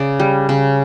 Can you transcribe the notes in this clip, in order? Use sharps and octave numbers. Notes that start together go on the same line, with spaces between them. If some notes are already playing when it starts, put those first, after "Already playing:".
Already playing: C#3 D5
G3
C#3